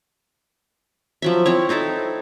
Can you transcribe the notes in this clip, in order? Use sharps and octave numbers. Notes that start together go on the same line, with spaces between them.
F3 F#3 E5
C4 E4 C#5
C4 D#4 E4 A4